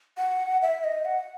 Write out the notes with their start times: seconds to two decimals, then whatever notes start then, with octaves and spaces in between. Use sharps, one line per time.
0.18 F#5
0.62 E5
0.84 D#5
1.05 F#5